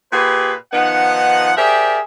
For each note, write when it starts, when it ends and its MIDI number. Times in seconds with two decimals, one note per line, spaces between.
0.12 0.54 46
0.12 0.54 67
0.12 0.54 68
0.12 0.54 71
0.73 1.51 51
0.73 1.51 53
0.73 1.51 59
0.73 1.51 63
0.73 1.51 78
1.57 1.99 67
1.57 1.99 68
1.57 1.99 70
1.57 1.99 72
1.57 1.99 74
1.57 1.99 76